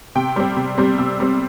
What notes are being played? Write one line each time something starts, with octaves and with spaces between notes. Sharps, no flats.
C3 G5
G3 C4
C3
G3 C4
C3 E6
G3 C4